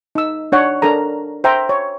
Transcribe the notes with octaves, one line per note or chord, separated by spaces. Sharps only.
D#4 E6
D4 C#5 F#5
D4 A4 A#4 A#5
C5 E5 G5 A#5
C#5